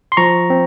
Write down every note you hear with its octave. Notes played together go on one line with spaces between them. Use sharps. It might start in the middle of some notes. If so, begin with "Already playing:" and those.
C6
F3 A#5 C#6
C4